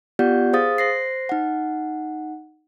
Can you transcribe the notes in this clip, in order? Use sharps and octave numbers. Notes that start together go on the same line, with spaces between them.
B3 F4 G4 D5 F#5 G6
G#4 C5 F5 D#6 A6
C5 A#6 C7
D#4 F#5